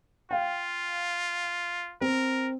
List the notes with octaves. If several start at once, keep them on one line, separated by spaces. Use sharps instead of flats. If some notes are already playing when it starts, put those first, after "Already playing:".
F4 F5 G5
C4 A#4